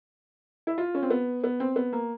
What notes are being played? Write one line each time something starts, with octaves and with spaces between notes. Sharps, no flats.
E4
F4
C#4
C4
B3
B3
C4
B3
A#3